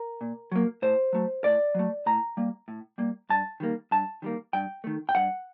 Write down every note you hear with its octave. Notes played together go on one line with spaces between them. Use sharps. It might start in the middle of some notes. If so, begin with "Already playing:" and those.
Already playing: A#4
A#2
F#3 A#3
A2 C5
F#3 A3
A2 D5
F#3 A3
A2 A#5
G3 A#3
A2
G3 A#3
G2 A5
D#3 G3 A#3
G2 A5
D#3 G3 A#3
G2 G5
D#3 A3
G5
G2 F#5